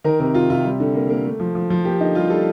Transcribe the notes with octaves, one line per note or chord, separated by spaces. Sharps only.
D#3 A#4
C3 A#4
C3 F4
C3 F4
G3
D3
A#3
A#3
A3
F3
F3
F3
A#3 G4
D3 D#4
G3 F4
G3 A4